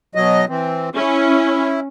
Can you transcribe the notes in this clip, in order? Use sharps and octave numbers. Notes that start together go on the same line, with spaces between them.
B2 F#3 D#5
E3 C4
C#4 E4